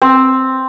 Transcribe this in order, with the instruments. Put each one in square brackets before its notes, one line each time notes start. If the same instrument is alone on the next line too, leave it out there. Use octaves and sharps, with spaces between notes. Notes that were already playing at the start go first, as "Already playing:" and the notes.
[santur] C4